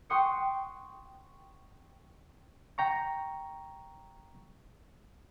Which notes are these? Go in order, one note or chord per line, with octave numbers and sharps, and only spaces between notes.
G5 C6 C#6 D#6 F#6 C#7
G5 A#5 C#6